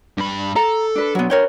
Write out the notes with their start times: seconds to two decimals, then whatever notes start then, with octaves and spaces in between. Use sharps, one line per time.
0.17 G2 B5
0.56 A4 A#5
0.95 D4 B4
1.15 F#3 B3
1.30 A#4 C#5 G5